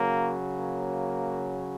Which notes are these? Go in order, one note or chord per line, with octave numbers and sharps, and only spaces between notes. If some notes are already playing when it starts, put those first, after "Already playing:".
Already playing: C#3 F#3 A#3
A#3